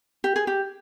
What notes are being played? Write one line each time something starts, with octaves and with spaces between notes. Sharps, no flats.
G4
G#4
G4